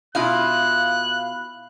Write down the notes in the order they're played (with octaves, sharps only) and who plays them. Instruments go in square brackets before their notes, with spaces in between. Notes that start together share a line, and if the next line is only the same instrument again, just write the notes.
[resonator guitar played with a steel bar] B2 E4 F4 [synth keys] F5 F6 [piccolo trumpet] F#6